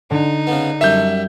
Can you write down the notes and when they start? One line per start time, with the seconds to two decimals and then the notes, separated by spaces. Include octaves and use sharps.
0.11 D3 D#4
0.47 C#3 B3
0.81 F#2 G3 C#5 E5 G6